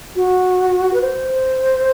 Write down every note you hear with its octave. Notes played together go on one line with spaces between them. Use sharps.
F#4
B4
C5